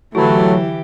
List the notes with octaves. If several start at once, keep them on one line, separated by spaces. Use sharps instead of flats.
D3 E3 F#3 A3 E4 G4